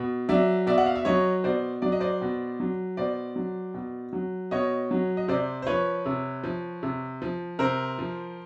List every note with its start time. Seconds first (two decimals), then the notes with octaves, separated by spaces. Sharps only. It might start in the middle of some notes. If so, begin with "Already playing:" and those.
Already playing: B2
0.29 F#3 D5 E5
0.66 B2 D5 E5
0.78 F#5
0.86 F5
0.95 E5
1.05 F#3 C#5 D#5
1.44 B2 C5 D5
1.82 F#3 D5
1.92 D#5
2.00 C5 D5
2.22 B2
2.60 F#3
2.97 B2 C5 D5
3.36 F#3
3.74 B2
4.13 F#3
4.51 B2 C#5 D#5
4.91 F#3
5.17 D#5
5.28 C3 C5 D5
5.62 C5
5.67 F3 B4 C#5
6.06 C3
6.43 F3
6.83 C3
7.22 F3
7.59 C3 A#4 C5
7.98 F3